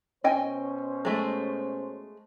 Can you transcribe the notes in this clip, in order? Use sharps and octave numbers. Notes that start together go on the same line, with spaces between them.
B2 C#4 C5 D#5 G5 G#5
G#3 A3